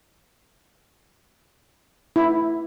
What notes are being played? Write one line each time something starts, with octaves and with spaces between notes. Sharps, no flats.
E4